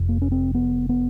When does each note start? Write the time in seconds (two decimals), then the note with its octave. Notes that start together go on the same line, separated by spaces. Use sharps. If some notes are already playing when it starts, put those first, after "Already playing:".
Already playing: F1 F2 C3
0.09 A#3
0.22 C#4
0.32 C4
0.54 B3
0.89 B3